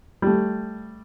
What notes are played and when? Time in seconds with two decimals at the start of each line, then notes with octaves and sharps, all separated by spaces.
0.22 G3 A3